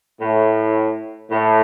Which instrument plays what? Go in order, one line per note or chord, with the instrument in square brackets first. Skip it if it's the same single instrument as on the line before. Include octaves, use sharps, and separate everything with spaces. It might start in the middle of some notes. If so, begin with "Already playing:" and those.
[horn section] A2
A2